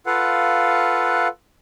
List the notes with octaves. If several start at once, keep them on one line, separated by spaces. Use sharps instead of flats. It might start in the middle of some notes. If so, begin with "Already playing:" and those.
F4 A4 B4 F5 F#5